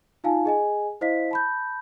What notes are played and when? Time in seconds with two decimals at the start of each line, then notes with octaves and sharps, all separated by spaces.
0.24 D#4 F4 F5 G#5 A5
0.45 G#4 D#5 G#5
1.01 E4 C5 D#5 F5 B6
1.31 A5 B5 G6